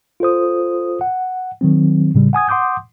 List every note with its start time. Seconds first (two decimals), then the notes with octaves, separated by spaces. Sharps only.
0.20 F4 A4 C5 D#6
1.01 F#5
1.61 D#3 F#3 C4
2.15 A2 C#3 G3
2.33 F#5 G#5 D#6 G#6
2.49 F#5 C6 D6 D#6 G6